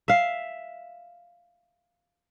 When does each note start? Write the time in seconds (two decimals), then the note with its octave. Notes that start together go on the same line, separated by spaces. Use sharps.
0.08 E5 F5